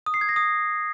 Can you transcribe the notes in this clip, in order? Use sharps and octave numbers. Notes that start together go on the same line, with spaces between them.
D#6
C7
G#6
A#6
D#6